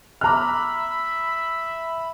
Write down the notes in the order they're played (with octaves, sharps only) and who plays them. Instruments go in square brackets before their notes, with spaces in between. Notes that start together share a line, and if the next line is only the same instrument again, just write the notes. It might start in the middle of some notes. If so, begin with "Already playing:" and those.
[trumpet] E5 [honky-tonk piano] A#5 F6 [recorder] B5 [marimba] D6 F#6